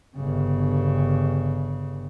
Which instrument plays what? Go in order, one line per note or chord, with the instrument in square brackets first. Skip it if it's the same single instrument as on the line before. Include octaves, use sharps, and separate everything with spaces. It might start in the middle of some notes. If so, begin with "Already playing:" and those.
[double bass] G1 C#3